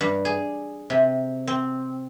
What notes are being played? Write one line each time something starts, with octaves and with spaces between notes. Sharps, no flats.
G2
G#4
C3
C4